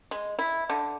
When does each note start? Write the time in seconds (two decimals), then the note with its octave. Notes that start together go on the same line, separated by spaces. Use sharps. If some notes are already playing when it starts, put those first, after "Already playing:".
0.11 G#3
0.39 E4
0.70 D3